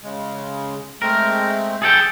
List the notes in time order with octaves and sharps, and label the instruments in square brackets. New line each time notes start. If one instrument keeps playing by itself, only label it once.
[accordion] C#3 G#3
[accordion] G#3 A3 C4 [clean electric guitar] A#4
[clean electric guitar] G#4 A4 G5